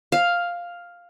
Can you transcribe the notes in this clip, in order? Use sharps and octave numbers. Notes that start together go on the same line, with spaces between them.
F5